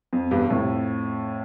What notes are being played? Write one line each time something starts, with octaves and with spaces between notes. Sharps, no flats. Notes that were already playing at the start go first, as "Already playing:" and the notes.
F2
E2 G2
F2 A2